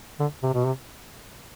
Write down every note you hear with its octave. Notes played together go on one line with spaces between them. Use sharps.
D3
C3
B2
C3